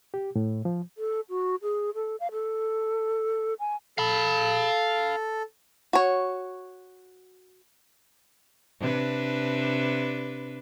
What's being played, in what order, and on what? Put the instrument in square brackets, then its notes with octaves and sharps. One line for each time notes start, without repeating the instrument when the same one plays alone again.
[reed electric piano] G4
A2
F3
[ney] A4
F#4
G#4
A4
F5
A4
G#5
[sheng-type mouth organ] A4 [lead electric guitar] F5 B5
[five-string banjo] F#4 C#5
[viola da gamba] C3 D4 B4